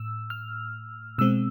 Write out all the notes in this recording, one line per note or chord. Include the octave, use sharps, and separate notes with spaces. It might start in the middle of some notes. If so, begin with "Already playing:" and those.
Already playing: A2 E6
F6
B2 G#3 C4 E6